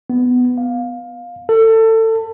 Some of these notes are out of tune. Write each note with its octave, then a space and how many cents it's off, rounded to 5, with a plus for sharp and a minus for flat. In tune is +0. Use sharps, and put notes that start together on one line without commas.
B3 +10
F5 +15
A4 +25